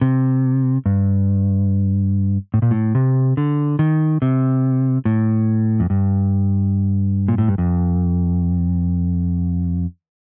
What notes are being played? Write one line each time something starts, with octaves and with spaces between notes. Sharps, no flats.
C3
G2
A2
A#2
A2
C3
D3
D#3
C3
A2
F2
G2
A#2
A2
G2
F2